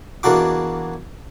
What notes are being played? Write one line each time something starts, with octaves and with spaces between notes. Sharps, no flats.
E2 A#3 D4 F#4 D6